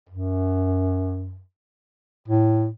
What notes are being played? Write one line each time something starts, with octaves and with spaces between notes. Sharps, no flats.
F#2
A2